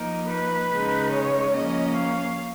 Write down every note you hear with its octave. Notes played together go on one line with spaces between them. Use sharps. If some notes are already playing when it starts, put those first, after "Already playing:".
Already playing: F3 A#3 D#4 A#4
B4
C#3 G#3 D#4
C#5
F3 A#3 C#4 D#5
F5